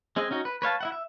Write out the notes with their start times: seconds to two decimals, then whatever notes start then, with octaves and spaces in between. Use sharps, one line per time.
0.16 G#3 C4 G#4 D#5
0.31 C#4 D#4 F#4
0.45 B4
0.62 B4 C#5 F5 A5
0.81 E4 E5 F#5
0.92 E5